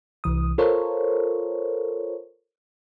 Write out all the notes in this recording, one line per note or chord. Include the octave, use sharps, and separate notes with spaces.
C2 E3 D#6
F4 A4 A#4 C5 C#5